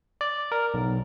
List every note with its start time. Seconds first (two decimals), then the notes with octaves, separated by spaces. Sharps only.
0.21 D5
0.52 A#4
0.74 B1